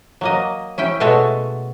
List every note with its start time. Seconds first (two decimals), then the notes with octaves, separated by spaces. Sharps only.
0.21 F#3 A#3 D#5
0.78 C#4 E4 G5
1.00 B2 G#3 A3 F#4 A4 C#5